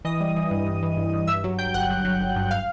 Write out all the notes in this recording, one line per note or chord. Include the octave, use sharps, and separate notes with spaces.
E3 D#5 D#6
G3
E3
G2
G2
E3
G2
G2
G2 E5 E6
F#3
F#3 G5 G6
G1 F#5 F#6
G2
F#3
G1
G2
F5 F6